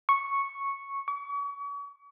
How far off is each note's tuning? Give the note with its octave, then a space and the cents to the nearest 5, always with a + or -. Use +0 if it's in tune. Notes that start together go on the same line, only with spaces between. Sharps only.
C#6 -5
C#6 +40